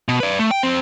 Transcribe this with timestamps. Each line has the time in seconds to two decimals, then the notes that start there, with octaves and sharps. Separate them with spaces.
0.08 B2
0.20 B4 D5
0.39 A3
0.51 G5
0.63 F2 C4